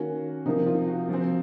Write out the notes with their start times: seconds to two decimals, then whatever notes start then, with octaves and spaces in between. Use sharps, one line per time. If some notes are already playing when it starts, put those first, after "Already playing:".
Already playing: D#3 A#3 C#4 F#4
0.45 C3 F3 A#3 D#4
0.67 F4
0.87 F#4
1.09 F3 C4